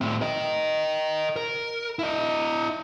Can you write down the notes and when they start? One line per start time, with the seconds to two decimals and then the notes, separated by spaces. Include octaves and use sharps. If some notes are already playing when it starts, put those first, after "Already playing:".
0.01 A2 C4
0.21 A#4 D#5
1.36 A#4
1.99 E4 D#5